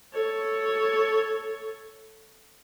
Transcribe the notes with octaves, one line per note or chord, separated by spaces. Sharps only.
A4 C#5